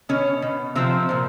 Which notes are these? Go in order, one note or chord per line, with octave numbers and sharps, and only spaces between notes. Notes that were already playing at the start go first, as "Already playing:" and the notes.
B2 C#4
B2
C3 F3 C4
A#2 F3